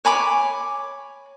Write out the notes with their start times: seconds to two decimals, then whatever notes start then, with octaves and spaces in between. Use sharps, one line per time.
0.05 C#5 G#5 B5 D6